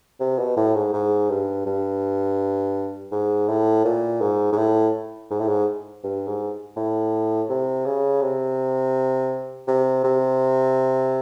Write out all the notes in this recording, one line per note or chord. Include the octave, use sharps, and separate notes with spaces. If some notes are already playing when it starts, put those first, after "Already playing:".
C3
B2
A2
G#2
G#2
G2
G2
G#2
A2
A#2
G#2
G#2
A2
G#2
A2
G#2
G2
G#2
A2
C3
C#3
C3
C3
C3